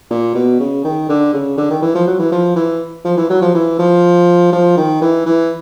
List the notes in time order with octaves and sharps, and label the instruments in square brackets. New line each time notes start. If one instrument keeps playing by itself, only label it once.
[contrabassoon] A#2
B2
C#3
D#3
D3
C#3
D3
D#3
E3
F3
F#3
E3
F3
E3
F3
E3
F#3
F3
E3
F3
F3
D#3
E3
E3